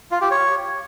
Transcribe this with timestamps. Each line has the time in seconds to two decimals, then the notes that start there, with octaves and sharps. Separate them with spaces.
0.11 F4
0.21 G4
0.31 C#5